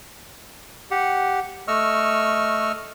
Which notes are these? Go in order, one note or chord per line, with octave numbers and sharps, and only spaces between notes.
G4 F#5
A3 D#5 C#6 E6 F6